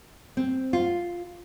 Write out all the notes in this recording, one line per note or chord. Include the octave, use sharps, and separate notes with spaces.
C4
F4